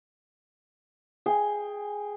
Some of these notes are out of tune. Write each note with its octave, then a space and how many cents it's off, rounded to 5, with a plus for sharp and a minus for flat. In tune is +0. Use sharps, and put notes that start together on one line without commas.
G#4 +0 G5 +20